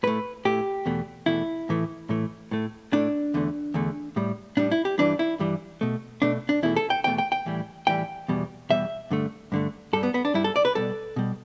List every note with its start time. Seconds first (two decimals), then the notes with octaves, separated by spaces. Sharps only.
0.03 A2 A3 B4
0.45 A2 A3 G4
0.86 E2 B2 A3
1.26 E2 B2 A3 E4
1.69 A2 E3 A3
2.09 A2 E3 A3
2.51 A2 A3
2.92 A2 A3 D4
3.34 E2 D3 A3
3.74 E2 D3 A3
4.16 A2 G3
4.57 A2 G3 D4
4.72 E4
4.85 G4
4.98 G2 E3 G3 D4
5.19 E4
5.40 G2 E3 G3
5.81 B2 A3
6.22 B2 A3 D4
6.49 D4
6.62 E2 B2 A3 E4
6.76 A4
6.90 G5
7.04 E2 B2 A3 G5
7.18 G5
7.32 G5
7.46 A2 E3 G3
7.87 A2 E3 G3 G5
8.28 E2 B2 G3
8.70 E2 B2 G3 E5
9.11 G2 D3 A3
9.52 G2 D3 A3
9.93 G2 G3 A4
10.03 B3
10.14 B3
10.25 D4
10.34 G2 G3 E4
10.44 A4
10.56 D5
10.65 B4
10.75 B2 G3 A4
11.16 B2 G3